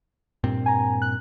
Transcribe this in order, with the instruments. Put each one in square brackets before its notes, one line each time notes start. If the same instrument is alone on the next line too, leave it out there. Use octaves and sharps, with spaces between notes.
[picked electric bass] G2 A#2 C4
[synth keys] G#5 A#5
F#6